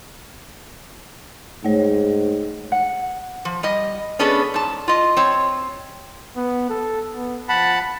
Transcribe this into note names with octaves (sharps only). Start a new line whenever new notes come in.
G#2 A3 C#5
F#5
F3
G3 D#5
B3 C#4 D4 G#4 A4 B4
G#2 A5
F4 D#5
C4 C#5
B3
A4
B3
F3 F#5 A5 B5